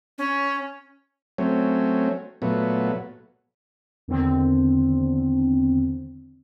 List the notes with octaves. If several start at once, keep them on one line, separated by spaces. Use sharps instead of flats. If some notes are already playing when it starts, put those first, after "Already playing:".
C#4
F#3 A3 C4 C#4
A#2 F#3 A3 B3
E2 D3 D#3 C4